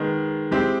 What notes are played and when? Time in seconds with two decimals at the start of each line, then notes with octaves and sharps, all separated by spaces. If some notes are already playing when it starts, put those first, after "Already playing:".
Already playing: D#3 G#3 B3
0.51 G#3 C4 E4 G4